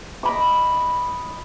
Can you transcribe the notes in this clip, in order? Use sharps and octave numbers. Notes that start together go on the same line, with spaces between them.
D#5 B5 D6